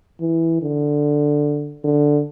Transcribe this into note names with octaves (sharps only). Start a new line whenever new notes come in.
E3
D3
D3